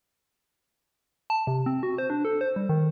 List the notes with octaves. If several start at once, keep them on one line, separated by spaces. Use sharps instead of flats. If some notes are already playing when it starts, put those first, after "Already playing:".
A5
C3
C4
F#4
C5
D4
A4
C5
G3
D#3